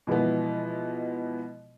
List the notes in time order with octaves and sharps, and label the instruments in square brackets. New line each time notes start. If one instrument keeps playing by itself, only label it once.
[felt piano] B2 E3 F3 G#3 B3